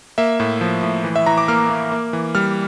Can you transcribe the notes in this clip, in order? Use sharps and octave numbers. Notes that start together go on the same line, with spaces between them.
A#3 E5
A2
F3
A2
E3
E5
E3 A#5
D6
A#3 F6
A#3
A#3
E3
G3 F6